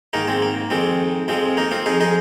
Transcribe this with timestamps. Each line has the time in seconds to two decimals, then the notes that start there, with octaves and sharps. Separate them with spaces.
0.13 G#2 D#3 A#3 D#4
0.28 G#3 C4
0.42 A#3
0.70 F2 D#3 G#3 C4
1.28 F2 F3 G#3 C4
1.57 A#3 D#4
1.71 C4 F4
1.86 F2 F3 D#4 G#4
2.00 D#4 G#4